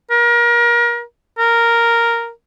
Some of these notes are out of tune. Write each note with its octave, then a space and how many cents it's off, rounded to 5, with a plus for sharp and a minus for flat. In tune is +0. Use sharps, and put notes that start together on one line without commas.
A#4 +30
A#4 -5